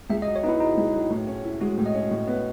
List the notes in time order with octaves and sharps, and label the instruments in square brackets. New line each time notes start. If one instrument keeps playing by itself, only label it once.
[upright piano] C#2 [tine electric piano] E5
[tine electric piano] D#5
[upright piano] F#3
[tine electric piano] C#5
[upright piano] B3 [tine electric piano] D#4 E4
[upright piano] B2 [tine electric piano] D#4
[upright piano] C#2
F#3
A2
C#4
E4
[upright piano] G#3 [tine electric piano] F#4
[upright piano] A2
[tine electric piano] D#5
[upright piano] C#4
A2
B3